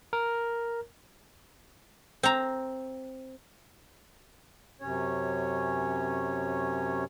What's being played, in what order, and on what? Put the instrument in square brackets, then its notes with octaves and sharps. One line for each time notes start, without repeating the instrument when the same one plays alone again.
[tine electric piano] A#4
[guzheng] C4 A#5
[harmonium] F#2 C3 C#4 C#5